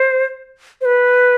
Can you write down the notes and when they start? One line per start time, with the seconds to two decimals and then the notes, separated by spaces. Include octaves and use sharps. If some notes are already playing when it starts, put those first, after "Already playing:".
Already playing: C5
0.81 C5
0.85 B4